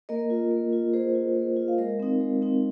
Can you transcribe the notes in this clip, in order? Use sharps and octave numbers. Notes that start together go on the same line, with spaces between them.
A#3 A#4 D#5
F4
A#3
F4
A#3 G#4 C5
F4
A#3
F4
F5
G#3 A#4 D#5
C4 D#4
G#3
C4 D#4